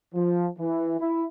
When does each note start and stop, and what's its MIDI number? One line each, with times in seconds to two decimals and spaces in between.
0.15 0.47 53
0.59 0.95 52
1.00 1.25 64